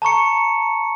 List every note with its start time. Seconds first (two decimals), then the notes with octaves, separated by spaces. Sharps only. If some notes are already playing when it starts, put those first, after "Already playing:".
0.02 A5 A#5 C#6 C#7